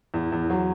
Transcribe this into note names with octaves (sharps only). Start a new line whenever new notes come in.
E2
E2
F#3